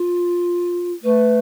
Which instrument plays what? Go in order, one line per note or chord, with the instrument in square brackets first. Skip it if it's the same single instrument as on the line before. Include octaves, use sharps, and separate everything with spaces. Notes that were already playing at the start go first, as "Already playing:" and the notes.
Already playing: [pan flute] F4
[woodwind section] A3 [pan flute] B4